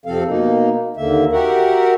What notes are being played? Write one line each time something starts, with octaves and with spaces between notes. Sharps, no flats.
F2 C3 F3 C4 A4 F5
B2 A#3 D#4
D#2 D3 A#3 E5
F#4 G4 A#4 E5 F#5